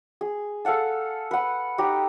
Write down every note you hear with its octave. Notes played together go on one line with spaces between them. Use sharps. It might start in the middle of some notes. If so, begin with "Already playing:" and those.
G#4
A4 F5 F#5 A5
B4 F#5
D#4 G4